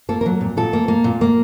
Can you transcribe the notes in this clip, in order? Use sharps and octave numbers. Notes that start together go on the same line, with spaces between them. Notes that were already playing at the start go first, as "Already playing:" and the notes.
A#3 A4
A#4
F#3
A#2
A#2 A4
A#3
A#3
A#2
A#3